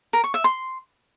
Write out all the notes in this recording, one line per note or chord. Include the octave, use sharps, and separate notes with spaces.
A#4
C#6
E5
C6